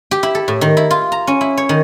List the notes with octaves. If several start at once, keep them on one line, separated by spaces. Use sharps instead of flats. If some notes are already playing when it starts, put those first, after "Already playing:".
G4
E4
A4
A2
D#3
E4
F4
A#5
C#4
E4
C#5
D#3